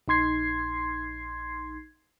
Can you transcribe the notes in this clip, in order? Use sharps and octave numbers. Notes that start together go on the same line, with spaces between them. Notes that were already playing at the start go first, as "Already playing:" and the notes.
A#1 D#4 C6 G#6 C7